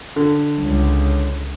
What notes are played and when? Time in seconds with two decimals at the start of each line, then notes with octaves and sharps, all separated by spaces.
0.16 D3
0.60 C#2